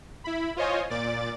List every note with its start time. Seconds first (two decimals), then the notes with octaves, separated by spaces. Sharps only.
0.24 E4 B5
0.56 F4 C5 C#5 D#5 G#5
0.90 A#2 D5 D6 A6